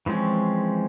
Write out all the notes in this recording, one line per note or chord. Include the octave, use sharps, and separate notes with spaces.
E3 F3 G#3 C4 C#4